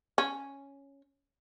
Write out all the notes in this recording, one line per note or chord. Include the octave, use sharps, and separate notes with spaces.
C#4